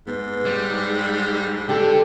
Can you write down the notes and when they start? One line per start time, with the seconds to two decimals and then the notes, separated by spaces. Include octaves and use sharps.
0.07 G#2 B3
0.45 G3 C#5
1.69 D3 D4 G4 A4